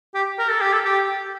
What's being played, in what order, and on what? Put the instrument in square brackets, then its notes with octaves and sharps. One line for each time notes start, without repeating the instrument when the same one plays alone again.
[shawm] G4
A#4
A4
G4
A4
G4